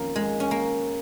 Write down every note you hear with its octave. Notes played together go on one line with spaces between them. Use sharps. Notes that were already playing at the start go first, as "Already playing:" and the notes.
Already playing: F2 D#3 A#3 C#4
G#3
C#4
A#3